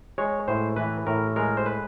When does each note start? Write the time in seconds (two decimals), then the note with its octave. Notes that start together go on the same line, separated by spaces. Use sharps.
0.18 G#3 C#5
0.48 A2 C5
0.76 E3 B4
1.07 A2 A#4
1.36 G#3 A#4
1.57 C5
1.66 B4